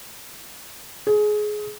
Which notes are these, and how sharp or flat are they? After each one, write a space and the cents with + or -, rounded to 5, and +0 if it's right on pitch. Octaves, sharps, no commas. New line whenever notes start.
G#4 +20